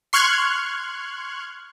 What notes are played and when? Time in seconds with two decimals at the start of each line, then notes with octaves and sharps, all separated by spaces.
0.13 C6 C#6 F6 F#6 G#6